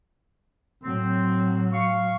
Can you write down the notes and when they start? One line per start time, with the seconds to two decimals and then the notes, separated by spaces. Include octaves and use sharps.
0.82 A2 F#3 C4
1.72 F5 C#6